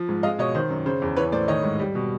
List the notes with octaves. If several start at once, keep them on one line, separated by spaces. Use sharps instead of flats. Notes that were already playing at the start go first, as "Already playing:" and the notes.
Already playing: F3
G#2
G#3 D#5 F5
B2 C#5 D#5
D#3 C5
F#2
C#3 C5
E2
E3 B4 C#5
A2 C5 D5
D#3 C#5 D#5
G#2
G3
B2